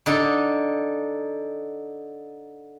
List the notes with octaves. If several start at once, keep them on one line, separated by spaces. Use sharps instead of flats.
D3 D#4 A4